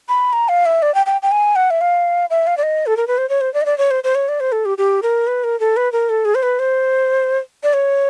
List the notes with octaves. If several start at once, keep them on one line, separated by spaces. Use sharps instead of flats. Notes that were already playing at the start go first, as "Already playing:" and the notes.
B5
A#5
F5
E5
D5
G5
G5
G5
G#5
F#5
E5
F5
E5
F5
D5
D#5
A4
A#4
B4
C5
C#5
C5
D5
D#5
D5
C#5
C5
C5
C#5
D5
C5
A4
G4
G4
A#4
B4
A#4
A4
B4
A#4
A4
G#4
C5
B4
C5
D5
C#5